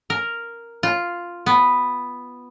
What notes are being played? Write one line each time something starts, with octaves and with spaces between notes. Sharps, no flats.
A#4
F4
B3